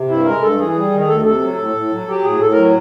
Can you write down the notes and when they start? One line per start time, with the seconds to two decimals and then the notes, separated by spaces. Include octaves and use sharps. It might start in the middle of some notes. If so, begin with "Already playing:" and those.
Already playing: C3
0.09 G2 E4
0.25 G#3 A#4
0.42 G2 A4
0.58 E3 G#4
0.75 G3
0.92 D#3
1.00 G#4
1.08 D2 A4
1.25 C3 A4
1.41 F#3
1.58 A2
1.75 A2
1.91 F#3
2.07 F#3 G4
2.24 A2 G#4
2.41 A2 A4
2.52 A#4
2.58 F#3